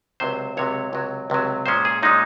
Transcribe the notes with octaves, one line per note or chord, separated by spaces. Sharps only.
C#2 C3 F#3 C5
C#2 C3 F#3 C#5
C#2 C3 F#3
C#2 C3 F#3
A#2 G#3 C#4 C5
G#4
A#2 G#3 C#4 D#4